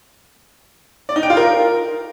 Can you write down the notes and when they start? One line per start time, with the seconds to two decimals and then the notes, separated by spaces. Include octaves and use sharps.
1.09 D5
1.16 D#4
1.23 G5
1.30 F4
1.37 A#4